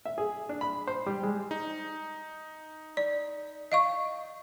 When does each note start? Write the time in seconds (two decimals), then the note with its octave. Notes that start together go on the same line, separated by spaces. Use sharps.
0.05 E5
0.18 G#4
0.49 D4
0.61 B5
0.87 C5
1.06 G3
1.23 G#3
1.51 D#4
2.97 D5
3.72 D#5 F5 C#6